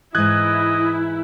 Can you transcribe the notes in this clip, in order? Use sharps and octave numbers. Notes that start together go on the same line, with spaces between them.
G#2 E3 E4 D#5 F#6 G#6